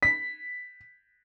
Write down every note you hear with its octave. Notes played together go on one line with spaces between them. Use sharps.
B6